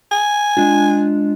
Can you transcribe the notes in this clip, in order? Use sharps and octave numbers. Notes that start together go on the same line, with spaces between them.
G#5
G#3 D4 F4